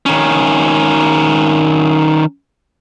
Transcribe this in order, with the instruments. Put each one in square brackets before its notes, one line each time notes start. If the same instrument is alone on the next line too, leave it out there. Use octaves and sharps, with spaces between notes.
[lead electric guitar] D#3 C#4